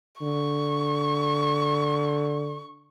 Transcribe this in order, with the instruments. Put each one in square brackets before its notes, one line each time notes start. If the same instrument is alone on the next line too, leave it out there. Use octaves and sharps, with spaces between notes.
[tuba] D3 [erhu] C#6